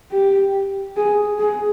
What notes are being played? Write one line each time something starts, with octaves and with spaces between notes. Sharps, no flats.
G4
G#4
G#4